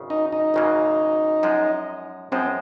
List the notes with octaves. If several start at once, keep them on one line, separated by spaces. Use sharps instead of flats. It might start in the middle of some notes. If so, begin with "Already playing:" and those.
Already playing: G#1 F#2 C#3
D#4
D#4
G#1 F#2 C#3 F#3 A#3
F#2 F3 G#3
F#2 F3 G#3 C4